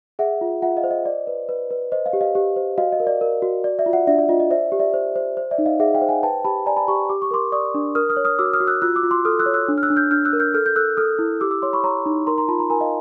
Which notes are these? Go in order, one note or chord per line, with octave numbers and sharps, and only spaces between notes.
G#4 E5 F#5
F4
F4 E5 F#5
D#5 F5
C5
D#5
D5
B4
B4
B4
C5 D#5
D#5 F5
G4
D#5 F5
G4
C5
F#4 D#5 F5
D#5
A#4
D5
A#4
F#4
D5
D5 E5
F4
E5 F#5
D4 D5 E5
D5 E5
F4 D#5
D#5
C5 D5 E5
G4
D5 E5
C5
C5
C5
D5 E5
D#4
D#5 F5
G#4 E5 F#5
F5 G5
C5
F#5 G#5
B4 G5 A5
G4 A5 B5
D5 G#5 A#5
A5 B5
G4 B5 C#6
G4 D6
C#6
A#4 C6 D6
D5 C#6 D#6
D4
A#4 D#6 F6
D#6 F6
C#5
D#6 F6
F#4 D6 E6
D#6 F6
F#4
E6 F#6
F4 E6 F#6
D6 E6
F4
C6 D6
A4 D#6 F6
E6 F#6
C#5
E6 F#6
D4
F6
E6 F#6
D4
F6 G6
D4 F6 G6
E6 F#6
A#4
F6 G6
A4 F6 G6
G6
A4 E6 F#6
A4 D#6 F6
E4
G4 D6 E6
D6 E6
C#5 C6 D6
B5 C#6
C#5 A#5 C6
D#4
A#4 A#5 C6
A#5 C6
F4 A5 B5
A#5 C6
A#4 G#5 A#5
D#5 F5